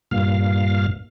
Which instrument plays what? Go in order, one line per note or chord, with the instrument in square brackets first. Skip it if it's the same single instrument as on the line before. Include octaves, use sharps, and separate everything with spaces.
[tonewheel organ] G2 A#2 F5